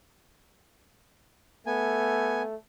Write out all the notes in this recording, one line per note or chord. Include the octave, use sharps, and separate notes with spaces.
A3 B3 G#5